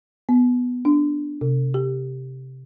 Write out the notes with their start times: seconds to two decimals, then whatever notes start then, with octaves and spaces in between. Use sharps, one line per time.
0.29 B3
0.85 D4
1.41 C3
1.74 G4